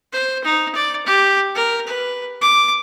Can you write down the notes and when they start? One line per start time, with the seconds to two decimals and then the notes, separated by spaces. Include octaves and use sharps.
0.13 C5
0.44 D#4
0.75 D5
1.06 G4
1.55 A#4
1.87 B4
2.41 D6